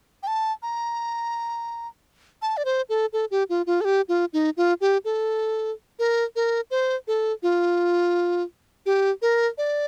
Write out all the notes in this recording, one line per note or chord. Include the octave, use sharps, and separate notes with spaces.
G5
A5
A#5
A5
D5
C5
A4
A4
G4
F4
F4
A4
G4
F4
D#4
F4
G4
A4
A#4
A#4
C5
A4
F4
G4
A#4
D5